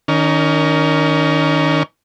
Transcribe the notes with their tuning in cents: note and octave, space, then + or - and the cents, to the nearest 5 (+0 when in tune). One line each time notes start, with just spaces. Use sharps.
D#3 +0 C#4 +30 A#4 +0